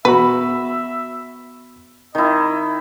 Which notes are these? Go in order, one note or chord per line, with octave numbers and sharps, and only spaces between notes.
B2 F#4 B4 E5 B5
D#3 E4 D#5